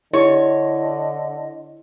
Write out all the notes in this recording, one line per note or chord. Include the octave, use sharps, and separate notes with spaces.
D3 E4 C#5 D#5